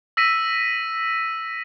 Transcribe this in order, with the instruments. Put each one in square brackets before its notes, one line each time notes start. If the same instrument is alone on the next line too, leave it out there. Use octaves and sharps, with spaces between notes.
[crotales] E6 A#6 B6 D#7